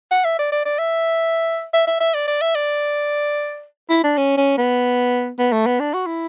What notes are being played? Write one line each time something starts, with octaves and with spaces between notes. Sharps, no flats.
F#5
E5
D5
D5
D5
E5
E5
E5
E5
D5
D5
E5
D5
E4
D4
C#4
C#4
B3
B3
A3
B3
D4
F#4
E4